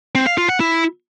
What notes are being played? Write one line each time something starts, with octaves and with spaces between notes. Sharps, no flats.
C4
F5
F4
F#5
E4